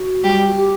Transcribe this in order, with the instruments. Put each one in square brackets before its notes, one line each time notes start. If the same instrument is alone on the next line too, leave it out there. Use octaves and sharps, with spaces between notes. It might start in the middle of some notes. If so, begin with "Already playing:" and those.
Already playing: [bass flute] F#4
[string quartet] G3 G4
[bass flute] F#4
G4